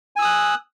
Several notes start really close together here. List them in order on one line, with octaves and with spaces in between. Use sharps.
G#5 E6 D#6 F#6